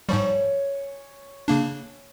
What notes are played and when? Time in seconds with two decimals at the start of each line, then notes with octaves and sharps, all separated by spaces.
0.09 G#2 F3 G3 C#5 G#5
1.48 C#3 A#3 D4